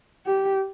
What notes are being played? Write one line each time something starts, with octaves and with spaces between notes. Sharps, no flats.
G4